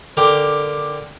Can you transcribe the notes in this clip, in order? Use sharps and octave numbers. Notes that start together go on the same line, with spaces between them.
D3 G4 A#4